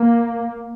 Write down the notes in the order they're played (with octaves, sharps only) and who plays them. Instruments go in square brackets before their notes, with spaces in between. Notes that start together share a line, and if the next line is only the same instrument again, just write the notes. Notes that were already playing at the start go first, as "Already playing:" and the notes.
Already playing: [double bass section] A#3